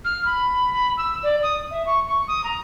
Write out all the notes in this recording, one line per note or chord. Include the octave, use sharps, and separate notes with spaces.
F6
B5
B5
E6
D5
D#6
E5
C#6
C#6
D#6
A#5